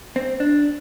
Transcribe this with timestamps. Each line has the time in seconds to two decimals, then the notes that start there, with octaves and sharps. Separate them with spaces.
0.16 C4
0.40 D4